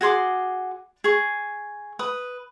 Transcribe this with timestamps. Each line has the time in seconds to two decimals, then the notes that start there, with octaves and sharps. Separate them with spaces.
0.01 F#4 G#4 C6 D6
1.04 G#4 C#6
1.99 B4 D#6